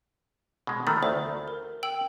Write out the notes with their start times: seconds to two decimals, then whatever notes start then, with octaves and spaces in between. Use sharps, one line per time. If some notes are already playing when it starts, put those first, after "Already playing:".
0.67 B2 G#3
0.87 D#3 A3 B5
1.03 D2 C5
1.48 A#4
1.83 G5 E6 F#7